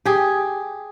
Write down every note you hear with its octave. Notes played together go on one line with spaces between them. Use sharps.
G4 G#4